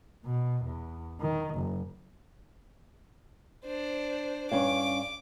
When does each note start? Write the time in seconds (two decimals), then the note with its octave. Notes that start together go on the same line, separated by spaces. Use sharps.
0.25 B2
0.65 E2
1.21 D#3
1.55 F#1
3.65 D4 C5
4.51 G2 C#4 F5 D6